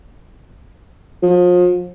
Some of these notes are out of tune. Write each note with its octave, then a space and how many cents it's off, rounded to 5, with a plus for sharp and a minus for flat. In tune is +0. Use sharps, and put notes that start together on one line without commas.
F3 +35